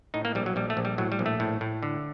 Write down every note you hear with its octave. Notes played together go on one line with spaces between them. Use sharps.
A2 D#4
A#3
A#1 G3
F#3
A#1 G3
A3
A#1
G3
A2 F#3
G3
A#1
A3
A2
A2
D3